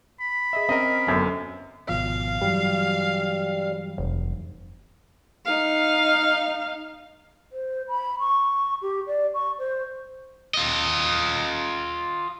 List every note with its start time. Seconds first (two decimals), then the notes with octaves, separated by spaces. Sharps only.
0.20 B5
0.53 G#4 D#5 E5
0.69 C4 C#4 A#4 D#5
1.07 G1 F#2
1.89 G#1 B2 F3 F5
2.42 G2 E3 F#3 G3
3.98 F1
5.45 D#4 F5
7.52 C5
7.88 B5
8.19 C#6
8.82 G4
9.07 D5
9.34 C#6
9.59 C5
10.54 F4 D#5